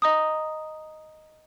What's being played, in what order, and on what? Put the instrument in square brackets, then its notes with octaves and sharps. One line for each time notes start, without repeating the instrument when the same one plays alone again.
[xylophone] D#5 A#5 D#6